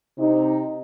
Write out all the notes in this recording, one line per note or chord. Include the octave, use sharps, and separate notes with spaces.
C3 D#4